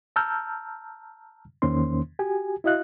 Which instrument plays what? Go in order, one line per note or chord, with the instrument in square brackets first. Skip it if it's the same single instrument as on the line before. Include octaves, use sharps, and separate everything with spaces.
[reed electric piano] A5 A#5 E6 F6 G6
E2 D#3 A#3 C#4 C5 C6
F#4 G4 G#5
E4 F#4 D#5 F5 F#6